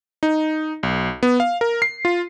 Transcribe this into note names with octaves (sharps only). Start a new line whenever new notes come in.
D#4
B1
B3
F5
A#4
C7
F4